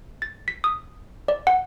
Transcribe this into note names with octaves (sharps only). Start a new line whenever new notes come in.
A6
B6
D#6
D5
F#5